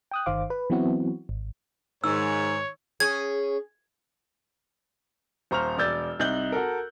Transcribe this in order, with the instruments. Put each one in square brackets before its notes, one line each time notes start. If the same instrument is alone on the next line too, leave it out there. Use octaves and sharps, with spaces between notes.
[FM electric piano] G5 D#6 F#6
G1 D#3 C5 F5 D6
B4
E3 F#3 B3 C4 E4 F#4
G#1
[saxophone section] G#2 [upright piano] D#3 [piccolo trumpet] C#5 [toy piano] E6
[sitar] C#4 G#4 [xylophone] G#6
[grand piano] D#1 C5 A#5 C#6 F6 F7
E1 D5 E6 G6 A6
C2 D#4 F#6 G6 F#7 G7
F#4 A4 A#4